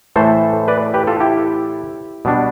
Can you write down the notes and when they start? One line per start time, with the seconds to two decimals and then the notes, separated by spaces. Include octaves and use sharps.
0.16 A2 E3 A3 A4 C5
0.68 B4 D5
0.94 G4 B4
1.07 F4 A4
1.20 E4 G4
2.25 B2 G3 B3 D4